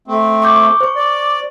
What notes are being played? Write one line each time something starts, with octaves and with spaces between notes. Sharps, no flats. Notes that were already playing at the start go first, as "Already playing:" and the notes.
A3 C4
C#6 D6 G6
C5 C#6
D5